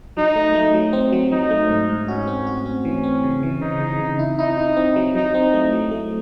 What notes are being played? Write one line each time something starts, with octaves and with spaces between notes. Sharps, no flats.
F#3 D#4
A3
A3
F#3
C4
F#3
F#3 D#4
A3
G#2
G#2
C#4 F#4
C4
F#4
C4
E3 C#4
C4
C#3
E3
C#3 D#4
C#3
C#3
E4
D#4 E4
E4
C4
F#3
F#3 D#4
C4
A3
F#3
A3